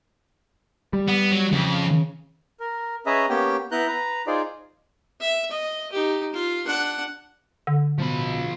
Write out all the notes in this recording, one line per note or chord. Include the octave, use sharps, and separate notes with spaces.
G3
B3
F#3
F2 C#3
A#4
C#4 G#4 B4 D#5 E5 A#5
A#3 B3 C#4 G4 G5
B3 E4 B4 A#5 F#6 G6
B4 A#5
D#4 F4 G#4 C5 D5
E5
D#5
D#4 G4
F4
D4 F#5
D3
B2 F3 B5